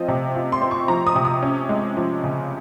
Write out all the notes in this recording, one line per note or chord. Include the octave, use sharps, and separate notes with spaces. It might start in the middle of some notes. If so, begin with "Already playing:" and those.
Already playing: F3 C4 F4 D#5
C3
F4
C6
C4
C#6
F3 A#5
D#6
C3
D#6
C#4
G#3
F3
C#3